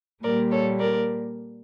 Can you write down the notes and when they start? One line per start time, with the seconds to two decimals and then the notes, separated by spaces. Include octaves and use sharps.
0.22 A#2 G3 A#3 A#4 D5
0.51 A4 C#5
0.79 A#4 D5